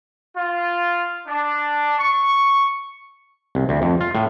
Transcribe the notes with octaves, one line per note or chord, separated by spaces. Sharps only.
F4
D4
C#6
C2
D2
F2
F4
A2